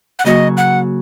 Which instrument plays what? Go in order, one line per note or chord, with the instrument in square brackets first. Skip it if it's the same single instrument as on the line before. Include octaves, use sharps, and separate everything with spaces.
[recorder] F#5
[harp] C#3 F#3 A#3 F#4 C#5 [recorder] D#5
[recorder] F#5